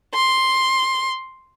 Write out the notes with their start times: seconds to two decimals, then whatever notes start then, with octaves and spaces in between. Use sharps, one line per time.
0.14 C6